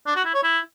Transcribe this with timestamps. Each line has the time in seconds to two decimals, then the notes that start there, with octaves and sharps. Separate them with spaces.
0.06 D4
0.16 F#4
0.25 E4
0.34 C#5
0.43 E4